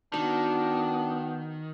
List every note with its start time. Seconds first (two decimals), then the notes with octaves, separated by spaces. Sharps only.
0.14 D#3 B3 D4 F#4